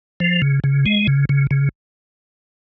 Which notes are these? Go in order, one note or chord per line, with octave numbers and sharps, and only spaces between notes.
F3
C#3
C#3
G#3
C#3
C#3
C#3